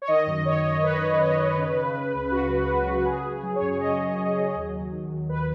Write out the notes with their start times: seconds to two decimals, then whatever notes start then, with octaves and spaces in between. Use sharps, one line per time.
0.02 C#5
0.08 D#3 D#5
0.27 F#2
0.45 F#2 C#5
0.64 F#2
0.83 D#3 B4
1.01 D#3
1.19 F#2
1.38 D#3
1.58 C#3
1.76 C#3
1.94 C#3
2.13 C#2
2.31 C#2 F#4
2.49 F#3
2.56 F#4
2.68 C#2
2.81 F#4
2.87 C#2
3.05 C#3 G#4
3.24 C#3
3.43 F#3
3.56 C#5
3.61 F#2
3.79 C#3 D#5
3.99 F#2
4.04 C#5
4.18 F#2
4.36 F#3
4.55 D#2
4.72 F#3
4.92 D#3
5.10 D#2
5.29 D#2 B4